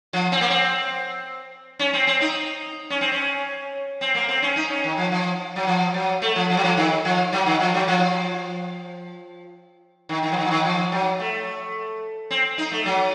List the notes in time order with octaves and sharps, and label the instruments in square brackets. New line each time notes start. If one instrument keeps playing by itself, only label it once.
[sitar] F3
C4
A#3
C4
C#4
C4
C4
D#4
C#4
C4
C#4
C4
A#3
C4
C#4
D#4
C#4
D#3
F3
F3
F#3
F3
F#3
A3
F3
F3
F#3
F3
D#3
F3
F#3
D#3
F3
F#3
F3
D#3
D#3
F3
D#3
F3
D#3
F3
F#3
A3
C4
D#4
A3
F#3